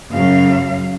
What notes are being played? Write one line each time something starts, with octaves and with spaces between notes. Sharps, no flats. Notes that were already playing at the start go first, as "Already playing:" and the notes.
F#2 C#3 F#3 F5